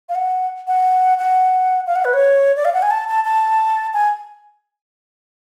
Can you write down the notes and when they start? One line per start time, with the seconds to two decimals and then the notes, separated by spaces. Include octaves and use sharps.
0.09 F5
0.15 F#5
0.67 F#5
1.18 F#5
1.87 F5
1.96 F#5
2.05 B4
2.14 C#5
2.56 D5
2.65 F5
2.74 F#5
2.82 G#5
2.91 A5
3.08 A5
3.25 A5
3.94 G#5